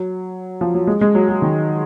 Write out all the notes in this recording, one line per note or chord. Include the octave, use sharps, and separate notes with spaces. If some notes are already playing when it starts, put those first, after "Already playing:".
Already playing: F#3
F3
F#3
G#3
G#3
F#3
F#3
D#3